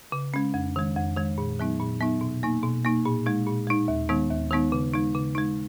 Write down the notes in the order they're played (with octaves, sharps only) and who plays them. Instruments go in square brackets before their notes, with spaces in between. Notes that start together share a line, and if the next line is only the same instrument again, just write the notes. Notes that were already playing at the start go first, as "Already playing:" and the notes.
[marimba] C#3
G#3 C#4
F2
D#3 G#3
F2
D#3 G#3
A#2
F#3 B3 D#4
A#2
F#3 B3 D#4
B2
A#3 D#4
B2
A#3 D#4
A#2
G#3 D#4
A#2
G#3 D#4
D#2
D#3 G#3 B3 D#4
D#2
D#3 G#3 B3 D#4
C#3
G#3 D#4
C#3
G#3 D#4